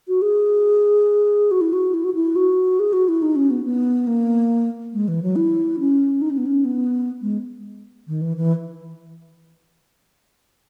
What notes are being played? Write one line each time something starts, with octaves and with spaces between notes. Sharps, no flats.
F#4
G#4
F#4
E4
F#4
E4
F#4
E4
F#4
G#4
F#4
E4
D#4
C#4
B3
B3
A#3
G#3
E3
F#3
E4
C#4
D#4
C#4
B3
C#4
B3
G#3
D#3
E3
E3